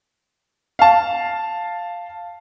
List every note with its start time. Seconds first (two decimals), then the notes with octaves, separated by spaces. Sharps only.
0.79 F5 A5